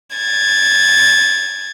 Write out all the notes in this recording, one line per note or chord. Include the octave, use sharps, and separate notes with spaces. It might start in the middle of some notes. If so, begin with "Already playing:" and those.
G#6 A6